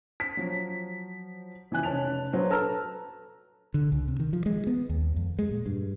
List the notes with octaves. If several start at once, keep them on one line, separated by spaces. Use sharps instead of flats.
B6
F3 F#3
F#1 E3 F3 G#5 F#6
F1 C#4 A5 F7
A#1 F#3 B4 C5
A4 B4 A5 A#5 E6 F6
D3
C#2
C3
D#3
F3
G#3
B3
D#2
F2
G#3
A#2
G2